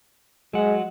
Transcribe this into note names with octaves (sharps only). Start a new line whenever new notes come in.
F#3 G#3 F#5